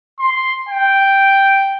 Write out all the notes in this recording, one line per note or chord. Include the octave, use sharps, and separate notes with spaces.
C6
G5